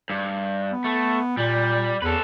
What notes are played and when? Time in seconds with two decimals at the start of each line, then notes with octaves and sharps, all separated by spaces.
0.10 G2
0.71 B3
0.84 A3
1.37 A#2 G3
2.02 E2 A4 B4